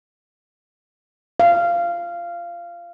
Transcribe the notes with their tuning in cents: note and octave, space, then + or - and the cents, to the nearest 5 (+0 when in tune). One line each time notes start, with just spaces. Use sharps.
F5 -15